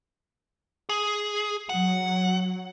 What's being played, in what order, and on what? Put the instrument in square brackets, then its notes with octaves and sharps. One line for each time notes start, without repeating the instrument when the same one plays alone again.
[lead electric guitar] G#4
[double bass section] F#3 [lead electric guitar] F#5